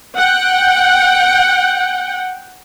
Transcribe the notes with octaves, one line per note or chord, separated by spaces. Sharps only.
F#5 G5